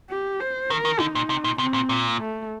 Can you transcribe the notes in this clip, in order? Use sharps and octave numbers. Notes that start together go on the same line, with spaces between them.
G4
C5
D#3 A#4
D#3
D3 D#4
A#2
C3
A#2
C3 C4
A#2
A#2
A3